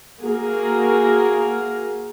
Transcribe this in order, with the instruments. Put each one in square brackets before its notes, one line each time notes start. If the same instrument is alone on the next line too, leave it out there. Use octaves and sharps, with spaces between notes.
[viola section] A#3 F#4 G#4 A#4